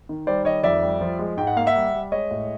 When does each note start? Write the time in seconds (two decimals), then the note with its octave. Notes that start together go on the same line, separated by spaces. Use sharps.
0.09 D#3
0.27 G3 C5 D5
0.45 D#3 C#5 D#5
0.63 F2 D5 E5
0.82 G3
1.01 F3
1.19 G#3
1.37 G#2 G5
1.47 F#5
1.56 A#3 F5
1.66 E5 F#5
1.75 G3
1.94 G3
2.12 G#3 C#5 D#5
2.31 A2